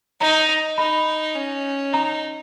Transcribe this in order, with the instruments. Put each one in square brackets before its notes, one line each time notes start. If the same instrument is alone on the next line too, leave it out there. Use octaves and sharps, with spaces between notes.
[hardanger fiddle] D#4 [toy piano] A#5
[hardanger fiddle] D#4 [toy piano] B5
[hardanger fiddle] C#4
[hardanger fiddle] D#4 [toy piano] A#5